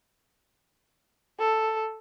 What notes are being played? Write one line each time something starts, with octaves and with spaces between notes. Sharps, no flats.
A4